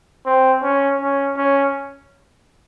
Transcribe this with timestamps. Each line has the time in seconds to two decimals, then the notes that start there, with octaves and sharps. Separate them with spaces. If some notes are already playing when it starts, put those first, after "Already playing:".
0.26 C4
0.63 C#4
1.01 C#4
1.37 C#4